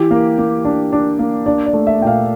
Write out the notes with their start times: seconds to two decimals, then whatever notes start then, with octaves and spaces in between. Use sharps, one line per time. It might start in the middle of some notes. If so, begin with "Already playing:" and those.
Already playing: E3 G4
0.11 A#3
0.38 A#3
0.65 D4
0.92 D4
1.19 A#3
1.46 D4 D5
1.66 D5
1.73 A3
1.87 E5
2.01 A#2 G5
2.07 F5